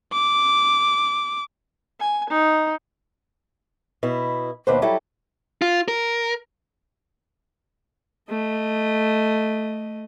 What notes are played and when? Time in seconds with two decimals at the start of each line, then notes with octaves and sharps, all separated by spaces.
0.12 D6
2.00 G#5
2.30 D#4
4.03 B2 E4
4.67 D#2 B2 D4 B4 C5
4.82 F#3 G3 E4 A4 A5
5.62 F4
5.88 A#4
8.29 A3 D#5